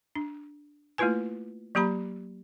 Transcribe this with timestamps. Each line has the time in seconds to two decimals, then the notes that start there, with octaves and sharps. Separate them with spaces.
0.15 D4
0.98 A3 A#3 E4 F4 B4 G#5
1.75 F#3 A#3 G4 A#5 B5